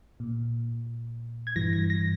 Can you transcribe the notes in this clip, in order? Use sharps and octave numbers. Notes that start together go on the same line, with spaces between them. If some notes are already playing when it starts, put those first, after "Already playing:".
A#2
G#6
G2 E3 A#6
A#6
A#6